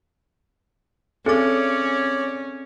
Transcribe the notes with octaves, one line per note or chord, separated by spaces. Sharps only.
C4 C#4 G#4 A4 C#5 D5 D6